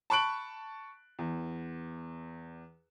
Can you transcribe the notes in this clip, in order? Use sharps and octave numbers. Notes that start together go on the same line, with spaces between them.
A5 B5 C#6 F#6 D7 F#7
E2